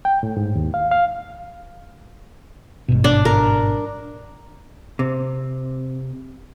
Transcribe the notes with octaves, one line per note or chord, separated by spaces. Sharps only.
G5
A2
G#2
D#2
F5
F5
G#1 G2 B2
D4
A#4
C3